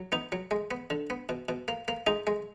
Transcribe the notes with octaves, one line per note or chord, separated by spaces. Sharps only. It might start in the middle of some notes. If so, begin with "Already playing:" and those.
Already playing: F#3
B3 D#4
F#3
G#3
B3
D3
B3
B2
B2
A#3
A#3
G#3 D#4
G#3